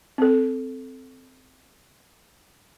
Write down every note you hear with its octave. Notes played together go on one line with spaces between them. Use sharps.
C4 A4